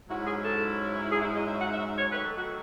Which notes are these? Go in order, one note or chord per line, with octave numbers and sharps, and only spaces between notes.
G#2 F#3 C#4 E4 F#4
G#4
A4
G#4
E4
D#5
E5
F#5
E5
C#5
D#3 F#3 A3 B4
A4
F#4